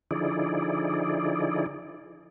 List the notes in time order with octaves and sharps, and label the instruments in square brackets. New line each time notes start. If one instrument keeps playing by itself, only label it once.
[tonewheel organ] D3 F3 D#4 E4 G#4 D5